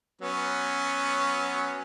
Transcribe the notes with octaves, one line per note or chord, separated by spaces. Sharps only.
F#3 B3 C#4